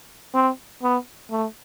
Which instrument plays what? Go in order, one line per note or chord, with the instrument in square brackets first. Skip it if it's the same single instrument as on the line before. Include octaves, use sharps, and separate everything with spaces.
[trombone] C4
B3
A3